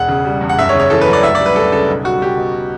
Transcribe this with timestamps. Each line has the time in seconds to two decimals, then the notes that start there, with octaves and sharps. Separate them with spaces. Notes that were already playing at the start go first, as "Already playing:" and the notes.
Already playing: E1 F#5
0.08 C#3
0.25 G3
0.41 E2
0.50 F#5
0.59 F#1 E5
0.69 C#5
0.74 C#3
0.80 C#5
0.90 E3 A4
1.01 B4
1.08 F#2
1.13 D5
1.23 D2 E5
1.35 D5
1.40 G3
1.46 B4
1.56 D2 A4
1.72 C#3 A4
1.89 B1
2.05 G3 F#4
2.22 B1 G4
2.37 B2